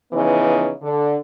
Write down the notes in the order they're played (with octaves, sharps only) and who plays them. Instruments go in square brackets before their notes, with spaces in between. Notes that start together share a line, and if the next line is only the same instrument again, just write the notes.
[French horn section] C#3 E3 F3 B3 D#4
D3